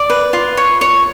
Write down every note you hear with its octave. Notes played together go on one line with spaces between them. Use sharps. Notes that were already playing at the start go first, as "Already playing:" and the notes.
Already playing: D5 D6
B4
F4
C#5
C#5